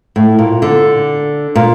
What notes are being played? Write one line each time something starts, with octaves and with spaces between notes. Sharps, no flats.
A2
A#2
D3
A#2